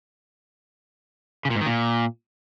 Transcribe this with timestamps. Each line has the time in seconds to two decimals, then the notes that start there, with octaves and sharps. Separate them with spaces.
1.45 C#3
1.50 A#2
1.56 G#2
1.61 D#3
1.66 A#2